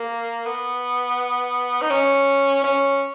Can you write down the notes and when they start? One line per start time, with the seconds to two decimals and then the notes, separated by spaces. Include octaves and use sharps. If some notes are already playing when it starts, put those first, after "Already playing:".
Already playing: A#3
0.46 B3
1.81 D#4
1.90 C#4
2.64 C#4